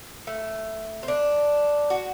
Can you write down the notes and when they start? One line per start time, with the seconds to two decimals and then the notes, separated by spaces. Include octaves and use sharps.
0.27 A3
1.03 C4
1.08 D4
1.90 F#4